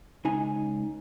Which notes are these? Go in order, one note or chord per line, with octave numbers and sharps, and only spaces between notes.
C#2 D#4 G#5